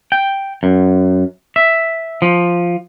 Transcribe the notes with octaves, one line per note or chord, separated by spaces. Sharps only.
G5
F#2
E5
F3